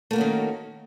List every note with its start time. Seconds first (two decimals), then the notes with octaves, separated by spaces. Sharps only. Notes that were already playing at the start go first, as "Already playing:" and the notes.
0.11 A3
0.13 A#3
0.16 F#4
0.18 C#4
0.21 D#3